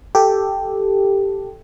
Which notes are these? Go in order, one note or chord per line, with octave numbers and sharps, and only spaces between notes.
G4 A4